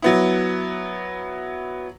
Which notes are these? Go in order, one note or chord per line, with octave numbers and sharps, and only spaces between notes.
F#3 B3 E4